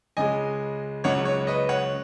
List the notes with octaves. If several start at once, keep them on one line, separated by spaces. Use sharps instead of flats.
C#2 C#3 G#3 D#5 G#5
C#2 C#3 F#3 C#5 F#5
C#5
B4 D#5
C#5 F#5